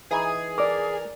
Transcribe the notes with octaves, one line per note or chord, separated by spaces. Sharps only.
E3 D#4 G#4 G#5
A#4 D5 D6